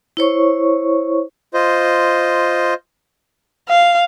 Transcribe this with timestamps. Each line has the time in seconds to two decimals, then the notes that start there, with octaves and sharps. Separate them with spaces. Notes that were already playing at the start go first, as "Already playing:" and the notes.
0.17 E4 C5 C#5 C#6
1.54 F4 C5 D#5
3.69 F5